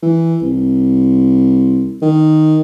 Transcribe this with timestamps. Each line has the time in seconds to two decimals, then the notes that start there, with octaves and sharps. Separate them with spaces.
0.03 E3
0.42 C2
2.02 D#3